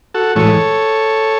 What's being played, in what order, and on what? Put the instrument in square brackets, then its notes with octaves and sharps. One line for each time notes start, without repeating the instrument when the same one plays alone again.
[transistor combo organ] F#4 A4
A2 E3 G#3 A4 C#5